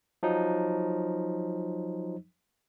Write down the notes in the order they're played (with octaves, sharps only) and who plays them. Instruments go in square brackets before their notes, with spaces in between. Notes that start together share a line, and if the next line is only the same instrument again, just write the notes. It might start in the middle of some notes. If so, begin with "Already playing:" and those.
[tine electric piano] F3 F#3 D#4